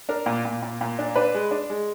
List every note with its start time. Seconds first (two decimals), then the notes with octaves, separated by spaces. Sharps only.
0.09 D4 A#4
0.26 A#2
0.45 A#2
0.62 A#2
0.81 A#2
0.99 D4
1.16 D4 B4
1.35 G#3
1.51 D4
1.70 G#3